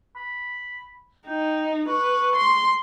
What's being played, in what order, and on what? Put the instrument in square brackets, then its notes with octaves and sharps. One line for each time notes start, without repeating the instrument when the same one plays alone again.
[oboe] B5
[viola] D#4 [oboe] G5
[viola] B4 [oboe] C#6
[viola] C6